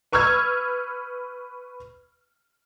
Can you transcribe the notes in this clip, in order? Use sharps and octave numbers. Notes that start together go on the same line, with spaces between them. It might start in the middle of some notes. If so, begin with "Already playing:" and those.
B4 C#6 E6 F6 G#6